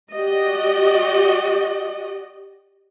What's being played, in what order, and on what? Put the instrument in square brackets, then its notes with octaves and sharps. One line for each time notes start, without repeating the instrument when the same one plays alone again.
[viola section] F#4 G4 D5 D#5